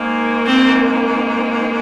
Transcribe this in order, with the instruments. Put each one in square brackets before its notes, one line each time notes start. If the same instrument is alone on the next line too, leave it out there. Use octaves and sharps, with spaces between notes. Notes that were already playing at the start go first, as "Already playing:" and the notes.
Already playing: [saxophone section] G#2 D#3 A#3
[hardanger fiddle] C4